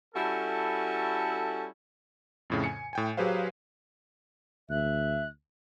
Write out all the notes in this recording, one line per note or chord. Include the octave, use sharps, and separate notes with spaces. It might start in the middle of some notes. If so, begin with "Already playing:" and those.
G3 C#4 E4 F#4 A4
F2 A2 C#3
G#5 C#7
A2 G5 G#5
F#3 G4 G#4 B4 C5 F5
D2 E5 F#6